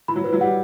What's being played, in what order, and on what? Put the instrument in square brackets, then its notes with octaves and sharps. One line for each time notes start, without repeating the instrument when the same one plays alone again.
[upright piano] E3 [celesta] B5
[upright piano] F#3
[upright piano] E3 [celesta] B4
[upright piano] F#3
[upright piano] G3 [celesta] F#5